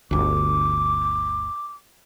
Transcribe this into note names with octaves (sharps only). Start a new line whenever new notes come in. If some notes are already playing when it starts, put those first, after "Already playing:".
G1 D2 D6